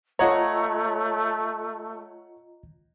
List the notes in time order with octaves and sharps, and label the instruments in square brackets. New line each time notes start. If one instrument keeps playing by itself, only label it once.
[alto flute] A3 [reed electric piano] F4 D#5 A#5 [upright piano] C#5 F#5